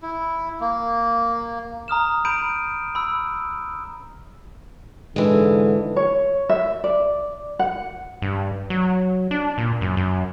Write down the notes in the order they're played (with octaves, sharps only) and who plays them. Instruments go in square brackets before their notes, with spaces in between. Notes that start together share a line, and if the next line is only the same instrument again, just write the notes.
[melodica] E4
A#3
[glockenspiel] A#5 D#6 F6 E7
A#5 B5 G6 D7 D#7
B5 E6
[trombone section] G#2 D3 A4 [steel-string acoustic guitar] E3 G#3
[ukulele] C#5
E5
D5
F#5
[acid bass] G2
F#3
D4
A#2
F#2
F#2